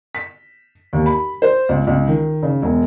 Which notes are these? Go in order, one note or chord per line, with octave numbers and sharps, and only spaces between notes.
B6
D#2
B5
C5
C#2
C#2
D#3
C#3
E1